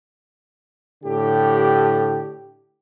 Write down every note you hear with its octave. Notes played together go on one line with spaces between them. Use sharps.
A2 D3 G4